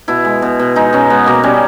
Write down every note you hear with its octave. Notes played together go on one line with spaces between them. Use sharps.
B2 E4
G#3
B2
B2
G#3 D#4
B2 C#4
G#3 B3
B2 A#3
G3 C#4